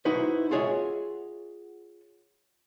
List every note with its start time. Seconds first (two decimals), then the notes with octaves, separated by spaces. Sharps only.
0.05 D#4 E4 F#4 B4 C5
0.51 F4 F#4 G#4 C#5 D#5 E5